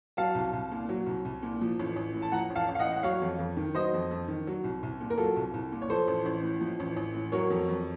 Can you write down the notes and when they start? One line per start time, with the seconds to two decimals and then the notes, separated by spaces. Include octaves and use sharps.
0.17 F#3 F5 A5
0.35 C2
0.53 C2
0.71 A#2
0.89 F#3
1.06 C2
1.25 C2
1.43 A#2
1.61 F3
1.79 A1
1.96 A1
2.14 A2
2.22 A5
2.32 F3 F#5 A#5
2.50 A1
2.55 F5 A5
2.68 A1
2.75 F5
2.79 D#5 F#5
2.86 A2
2.96 F#5
3.03 F#3 C#5 F5
3.22 F2
3.39 F2
3.57 D#3
3.75 F#3 C5 D#5
3.94 F2
4.11 F2
4.28 D#3
4.47 F#3
4.64 C2
4.83 C2
5.01 A#2
5.10 A#4
5.17 F#3 F4 A4
5.36 C2
5.54 C2
5.72 A#2
5.82 C#5
5.89 F3 A4 C5
6.07 A1
6.25 A1
6.43 A2
6.60 F3
6.80 A1
6.96 A1
7.14 A2
7.32 F#3 A#4 C#5
7.50 F2
7.68 F2